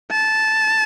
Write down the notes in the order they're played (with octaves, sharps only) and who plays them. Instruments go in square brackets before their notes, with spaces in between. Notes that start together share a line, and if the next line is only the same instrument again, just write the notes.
[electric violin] A5